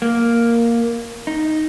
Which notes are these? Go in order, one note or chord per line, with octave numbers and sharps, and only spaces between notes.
A#3
D#4